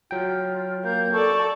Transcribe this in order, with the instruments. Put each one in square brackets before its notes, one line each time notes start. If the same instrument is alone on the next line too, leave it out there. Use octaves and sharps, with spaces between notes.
[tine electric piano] F#3 G5 [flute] F4
[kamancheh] A#3 [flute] G6
[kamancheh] A4 D5 [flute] C#6